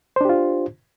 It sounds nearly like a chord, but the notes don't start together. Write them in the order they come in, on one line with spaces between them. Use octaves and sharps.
C5 D4 G4 F4